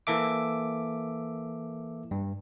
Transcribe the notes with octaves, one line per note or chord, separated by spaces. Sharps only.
E3 A#3 A4 E5 D6
G2